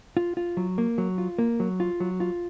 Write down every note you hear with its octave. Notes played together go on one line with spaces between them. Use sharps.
F4
F4
F#3
A#3
F#3
F4
A#3
F#3
F4
F#3
F4